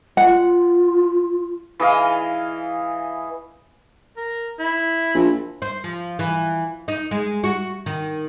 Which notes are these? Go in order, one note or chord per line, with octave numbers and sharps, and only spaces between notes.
F4 F#5
E3 G#4 D#5 F5
A#4
E4
A#1
C5
F3
E3
D#4
G#3
F#4
D#3